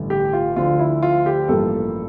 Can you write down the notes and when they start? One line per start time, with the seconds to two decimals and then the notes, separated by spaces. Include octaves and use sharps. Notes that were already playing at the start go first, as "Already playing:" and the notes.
Already playing: A1 G2 D3 A3
0.10 G4
0.33 F4
0.56 D2 D3 F3 F4
0.79 E4
1.03 F4
1.26 G4
1.48 A1 G2 F3 A#3 A4